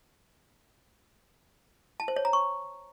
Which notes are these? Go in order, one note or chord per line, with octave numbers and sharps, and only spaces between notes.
A5
C5
C#5
A#5
C#6